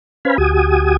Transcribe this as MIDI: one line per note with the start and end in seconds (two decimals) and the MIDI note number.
0.25 0.37 61
0.25 0.37 71
0.25 0.37 72
0.25 0.37 77
0.25 0.37 80
0.25 0.37 83
0.38 0.97 38
0.38 0.97 66
0.38 0.97 67
0.38 0.97 80
0.38 0.97 87